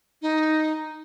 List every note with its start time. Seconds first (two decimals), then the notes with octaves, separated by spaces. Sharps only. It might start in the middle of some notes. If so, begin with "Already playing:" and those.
0.22 D#4